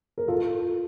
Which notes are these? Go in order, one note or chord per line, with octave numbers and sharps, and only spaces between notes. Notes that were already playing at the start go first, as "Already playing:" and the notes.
A#4
F4 A4